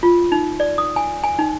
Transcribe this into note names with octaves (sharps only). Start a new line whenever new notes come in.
F4
D#4
D5
D#6
G#5
G#5
D#4